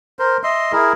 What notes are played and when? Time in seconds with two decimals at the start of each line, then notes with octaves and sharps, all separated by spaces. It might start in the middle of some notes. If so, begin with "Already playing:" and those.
0.19 A#4 C5
0.43 D#5 E5 C6
0.72 E4 G#4 A#4